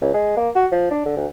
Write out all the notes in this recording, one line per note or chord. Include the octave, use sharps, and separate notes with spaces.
C#2
G#3
A#3
F#4
F3
D4
D3
D2